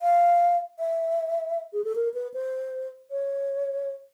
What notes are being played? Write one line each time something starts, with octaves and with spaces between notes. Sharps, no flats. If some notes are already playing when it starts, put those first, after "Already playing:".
F5
E5
G#4
A4
A#4
B4
C5
C#5